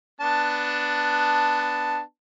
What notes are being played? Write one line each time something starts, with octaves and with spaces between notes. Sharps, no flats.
B3 D4 A5